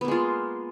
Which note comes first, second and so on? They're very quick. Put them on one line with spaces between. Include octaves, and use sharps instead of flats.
B3 A#3 G#3 F4